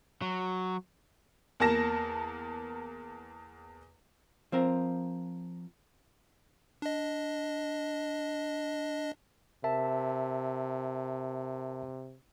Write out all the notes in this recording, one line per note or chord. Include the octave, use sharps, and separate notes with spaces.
F#3
E2 A#3 A#4 A5 A#6 E7
F3 C4 A#4
D4 D#5
C3 A#4 E5 A5